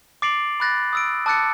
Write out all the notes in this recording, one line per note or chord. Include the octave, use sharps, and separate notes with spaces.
D6 A6 C7 D7 F7 F#7
B5 D6 F#6 A6 A#6
D#6 E6 D7
A5 D6 E6 F#6 A6 C#7